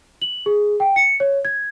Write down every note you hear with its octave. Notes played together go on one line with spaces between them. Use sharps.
F#7
G#4
G5
C#7
C#5
G#6